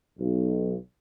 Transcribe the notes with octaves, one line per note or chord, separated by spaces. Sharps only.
B1